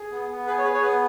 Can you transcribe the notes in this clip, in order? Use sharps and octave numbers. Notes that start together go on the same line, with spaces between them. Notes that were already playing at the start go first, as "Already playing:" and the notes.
Already playing: G#4
B3
B3
G#4 B4
C#5
G#4 B4
C#5
B3 B4